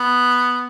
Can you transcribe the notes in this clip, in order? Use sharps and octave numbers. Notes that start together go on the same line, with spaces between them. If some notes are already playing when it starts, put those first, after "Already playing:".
Already playing: B3